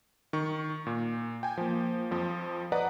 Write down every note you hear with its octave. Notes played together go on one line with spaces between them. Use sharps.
D#3 C#6
A#2
G5 G#5
F3 A#3
F2 F3
B4 D5 D#5 F#5 A#5